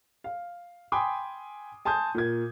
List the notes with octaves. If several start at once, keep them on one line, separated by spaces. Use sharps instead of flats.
F5
G5 G#5 B5 C6 D6 D#6
G#5 A5 C6 D#6 G6
A#2 A#3 G#6